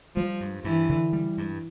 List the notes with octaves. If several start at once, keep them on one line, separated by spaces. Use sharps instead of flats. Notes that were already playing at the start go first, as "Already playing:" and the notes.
F3 G3
G2
G2 E3
D3
G3
G2